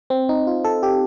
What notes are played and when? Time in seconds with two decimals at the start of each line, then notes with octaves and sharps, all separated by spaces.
0.10 C4
0.29 D#4
0.47 F4
0.64 A4
0.83 G4